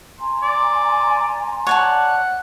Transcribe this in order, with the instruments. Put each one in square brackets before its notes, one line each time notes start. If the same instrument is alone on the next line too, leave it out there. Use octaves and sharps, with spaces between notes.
[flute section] G#5 A#5 C6
[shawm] D5
[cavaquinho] C#5 D5 A5 [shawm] F#5